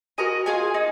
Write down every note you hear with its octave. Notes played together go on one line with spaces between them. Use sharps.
F#4 A#4 D#5 G#5
F4 G#4 D#5 G#5
D#4